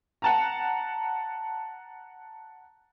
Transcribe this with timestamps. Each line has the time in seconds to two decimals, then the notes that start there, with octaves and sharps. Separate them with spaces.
0.22 F#5 A5 A#5